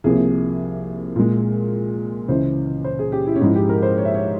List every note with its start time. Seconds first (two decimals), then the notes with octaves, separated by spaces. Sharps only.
0.04 C2 C3 F3 A#3 G#4
1.16 A#2 G#3
2.28 C#2 C#3 E3 C5
2.84 C5
2.99 G#4
3.12 G4
3.26 E4
3.36 C#4
3.41 G#2 F3 G#3 E4
3.55 G4
3.69 A#4
3.82 C5
3.97 C#5
4.05 E5
4.14 C#5